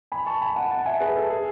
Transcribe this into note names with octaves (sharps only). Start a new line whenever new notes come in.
G#5 B5
A5 C#6
G#5 B5
F#5 A5
F#5 A5
A5
E5 G#5
G#4 B4
A4
G#4